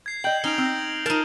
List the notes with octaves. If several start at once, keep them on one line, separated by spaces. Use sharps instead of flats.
G#6 C7
D#5 G5 G6 F#7
C#4 D#4 D7 F7 G7
C4 F6 A#6
D#4 F4 A#4 A5